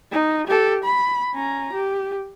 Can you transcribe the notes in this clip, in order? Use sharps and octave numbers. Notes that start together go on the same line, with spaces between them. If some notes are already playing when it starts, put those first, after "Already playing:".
D#4
G4 A4
B5
C#4 A#5
G4